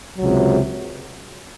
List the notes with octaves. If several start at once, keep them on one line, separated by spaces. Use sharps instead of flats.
C#2 C3 F#3